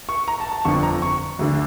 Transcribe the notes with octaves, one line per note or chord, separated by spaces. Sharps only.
C#6
A#5
A5
A5
G1 F2 D3 C#6
A#5
C#6
D2 D3